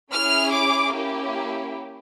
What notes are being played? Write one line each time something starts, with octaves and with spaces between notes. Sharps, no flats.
C#4 E4 G#4 F6
D6
A#3 C#4 E4 G4